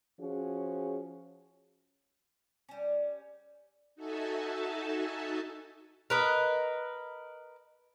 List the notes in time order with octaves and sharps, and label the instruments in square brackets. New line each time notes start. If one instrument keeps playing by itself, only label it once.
[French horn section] F3 C#4 F#4 G#4
[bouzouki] G3 C#4
[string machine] D#4 F#4 A4 E5 G#5 A5
[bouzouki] A#4 B4 D#5